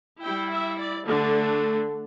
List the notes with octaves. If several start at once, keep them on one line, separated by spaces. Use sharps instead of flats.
G3 E4 G5
E5
D5
D3 A3 D4